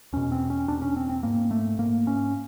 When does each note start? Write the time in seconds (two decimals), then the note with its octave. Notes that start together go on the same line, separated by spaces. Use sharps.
0.13 E2 B2 C#4
0.32 C4
0.50 C#4
0.68 E2 B2 D4
0.82 C#4
0.97 C4
1.09 C4
1.23 G#2 A#3
1.51 A3
1.79 G#2 A#3
2.07 C#4